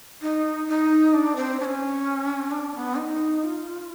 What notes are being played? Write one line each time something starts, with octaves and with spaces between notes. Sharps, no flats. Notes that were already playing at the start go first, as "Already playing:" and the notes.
D#4
D#4
D4
C4
D4
C#4
D4
B3
D#4
F4